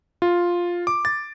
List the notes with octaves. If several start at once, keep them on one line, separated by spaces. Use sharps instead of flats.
F4
D6
A6